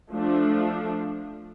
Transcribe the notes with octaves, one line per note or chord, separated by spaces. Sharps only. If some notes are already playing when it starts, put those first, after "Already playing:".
F3 A3 D4